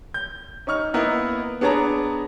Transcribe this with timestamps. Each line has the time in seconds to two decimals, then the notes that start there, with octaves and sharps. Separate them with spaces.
0.14 G6
0.67 C#4 D#4 C#6 F6
0.94 A#3 B3 E4 A#4 B4 D#5
1.61 B3 D4 G#4 C#5 A5 A#5